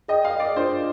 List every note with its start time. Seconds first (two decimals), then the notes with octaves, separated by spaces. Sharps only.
0.08 G#4 D5 D#5 G5
0.24 F5
0.40 D5
0.56 D4 F4 A#4 C5